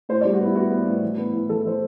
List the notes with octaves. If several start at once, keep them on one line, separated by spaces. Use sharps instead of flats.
A2 C5
D5
G3
F#4
B3 E4
B3 F#4
B3
A2
E3
B3
E3
E3 A4
E3 C5